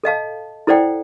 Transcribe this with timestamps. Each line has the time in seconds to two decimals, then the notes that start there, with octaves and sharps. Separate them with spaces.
0.04 A4 D#5 F5 A5
0.67 E4 A4 C5 D5 F#5 G5